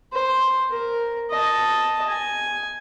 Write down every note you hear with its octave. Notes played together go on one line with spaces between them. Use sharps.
C5
A#4
D#5 A5
G#5